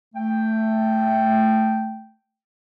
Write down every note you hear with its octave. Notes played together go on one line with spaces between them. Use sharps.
A3 G5